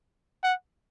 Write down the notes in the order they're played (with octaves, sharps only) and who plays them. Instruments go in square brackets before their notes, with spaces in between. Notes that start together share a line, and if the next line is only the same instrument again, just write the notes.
[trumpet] F#5